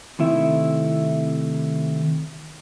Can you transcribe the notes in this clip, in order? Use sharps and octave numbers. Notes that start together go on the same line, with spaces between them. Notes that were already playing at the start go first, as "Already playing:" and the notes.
C3 D#3 A3 E4 E5